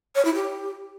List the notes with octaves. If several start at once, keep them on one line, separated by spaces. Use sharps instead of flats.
C#5
E4
G4